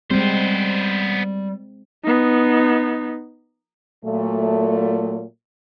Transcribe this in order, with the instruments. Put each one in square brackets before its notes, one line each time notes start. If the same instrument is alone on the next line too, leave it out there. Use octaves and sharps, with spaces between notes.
[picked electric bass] G3 [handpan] G#3 C4 [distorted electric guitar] B3 C5
[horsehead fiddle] B3 D#4
[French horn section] A#2 F#3 A3